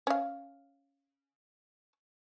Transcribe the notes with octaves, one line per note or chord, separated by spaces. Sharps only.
C#4 F5